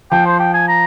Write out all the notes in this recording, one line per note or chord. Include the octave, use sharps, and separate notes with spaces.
F3 G5
C5
G5
G#5
A#5